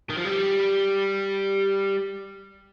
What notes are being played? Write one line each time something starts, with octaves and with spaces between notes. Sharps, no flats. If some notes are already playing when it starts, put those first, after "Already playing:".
D#3
F3
G3